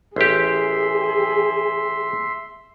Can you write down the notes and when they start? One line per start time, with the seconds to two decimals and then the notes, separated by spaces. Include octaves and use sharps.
0.16 A1 G4 G#4 E5 C6